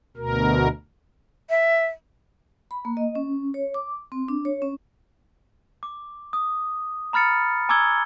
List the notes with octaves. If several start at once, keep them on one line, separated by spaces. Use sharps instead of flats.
D2 B2 A#4
E5
B5
A#3
D#5
C#4
C#5
D6
C4
D4
C#5
C#4
D6
D#6
A#5 B5 F6 A6 C#7
G#5 A#5 D6 E6 G#6 G7